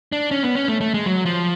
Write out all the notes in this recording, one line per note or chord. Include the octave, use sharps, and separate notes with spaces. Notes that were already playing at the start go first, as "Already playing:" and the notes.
D4
C#4
B3
C#4
A3
A3
G#3
F#3
F3